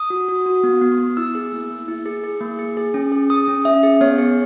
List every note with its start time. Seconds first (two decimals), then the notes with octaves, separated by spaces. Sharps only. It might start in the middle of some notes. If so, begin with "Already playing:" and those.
Already playing: D#6
0.10 F#4
0.28 F#4
0.46 F#4
0.63 B3
0.81 B3
0.99 B3
1.17 E4 E6
1.35 G#4
1.53 A#3
1.71 A#3
1.88 E4
2.06 G#4
2.24 G#4
2.41 A#3
2.59 G#4
2.77 G#4
2.94 C#4
3.12 G#4
3.30 G#4 D#6
3.48 C#4
3.65 C#4 E5
3.83 G#4
4.01 B3 C#5
4.18 G#4